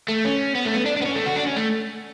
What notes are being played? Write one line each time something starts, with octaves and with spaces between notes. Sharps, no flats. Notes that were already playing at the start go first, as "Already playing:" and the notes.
A3
C#4
B3
A3
B3
D4
D4
B3
C#4
A3
F#4
D4
C#4
A3